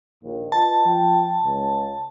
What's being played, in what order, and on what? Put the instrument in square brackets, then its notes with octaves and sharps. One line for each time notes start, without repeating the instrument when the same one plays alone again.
[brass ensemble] A#1 D#2
[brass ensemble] F4 B4 D#5 [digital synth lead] A5
[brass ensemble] F3 G5
C#2